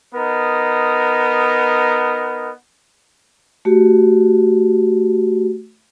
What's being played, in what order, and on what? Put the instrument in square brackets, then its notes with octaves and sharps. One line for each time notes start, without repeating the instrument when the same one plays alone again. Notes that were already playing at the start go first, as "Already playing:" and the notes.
[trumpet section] B3 D#4 A#4
[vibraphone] A3 F#4 G4